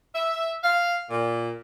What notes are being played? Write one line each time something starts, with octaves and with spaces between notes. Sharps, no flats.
E5
F5
A#2